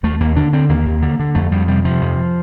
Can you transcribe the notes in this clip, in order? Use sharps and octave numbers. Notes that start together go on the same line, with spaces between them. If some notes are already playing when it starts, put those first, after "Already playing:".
D#2 A3
D#2 A#3
D3 D4
D3 C4
D#2 A#3
D#2
D3
D3
F2 A3
F2 G3
C3 G3
C3 F3
F2